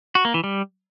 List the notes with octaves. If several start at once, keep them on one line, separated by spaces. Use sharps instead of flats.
F#4
A#3
E3
G3